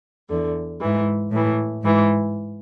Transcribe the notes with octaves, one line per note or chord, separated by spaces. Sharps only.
E2 D3
G#2 E3
A2 E3
G#2 E3